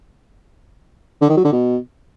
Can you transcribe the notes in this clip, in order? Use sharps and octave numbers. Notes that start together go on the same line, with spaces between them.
D3
D#3
F#3
D3
B2